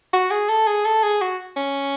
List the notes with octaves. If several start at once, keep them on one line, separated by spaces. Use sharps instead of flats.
F#4
G#4
A4
G#4
A4
G#4
F#4
C#4